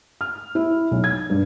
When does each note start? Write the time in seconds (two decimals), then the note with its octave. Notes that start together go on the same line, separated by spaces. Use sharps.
0.21 F6
0.55 E4
0.91 B1
1.04 G#6
1.30 G2